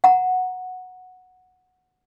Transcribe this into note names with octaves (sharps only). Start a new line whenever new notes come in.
F#5 A#5